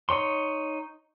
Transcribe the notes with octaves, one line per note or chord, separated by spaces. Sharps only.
D#4 C#5 C6